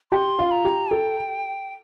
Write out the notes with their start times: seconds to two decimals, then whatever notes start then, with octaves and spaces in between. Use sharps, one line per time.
0.12 G4 G5 C6
0.39 F4 F5
0.51 A#5
0.65 G4
0.91 A4 G5